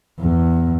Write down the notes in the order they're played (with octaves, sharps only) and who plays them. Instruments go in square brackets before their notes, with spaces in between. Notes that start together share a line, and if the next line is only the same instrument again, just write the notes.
[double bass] E2